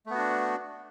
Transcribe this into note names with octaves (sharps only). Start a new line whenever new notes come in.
A3 B3 D4 F#4